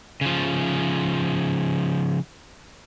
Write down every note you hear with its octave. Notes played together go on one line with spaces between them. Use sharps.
C#3 F3